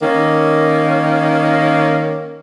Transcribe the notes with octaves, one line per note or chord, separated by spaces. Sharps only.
D#3 A#3 C#4